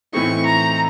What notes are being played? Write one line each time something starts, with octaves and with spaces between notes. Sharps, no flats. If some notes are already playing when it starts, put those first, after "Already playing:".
A2 E3 A3 C4 D#4 C#6
A#5